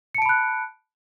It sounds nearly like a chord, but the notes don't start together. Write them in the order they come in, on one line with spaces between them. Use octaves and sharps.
C#7 A5 D7 B5 F#6